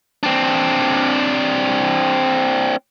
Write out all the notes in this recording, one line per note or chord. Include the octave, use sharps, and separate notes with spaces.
C4 D4